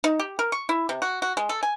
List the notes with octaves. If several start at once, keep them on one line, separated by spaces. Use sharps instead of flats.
D#4
G4
A#4
C#6
E4
C3
F#4
F#4
G#3
A4
G#5